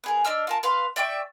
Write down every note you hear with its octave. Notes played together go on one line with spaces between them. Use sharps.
B3 G#4 A#4
D4 D#5 E6 F6
F4 A#4 A5
B4 F5 C6
D5 E5 G5 C#6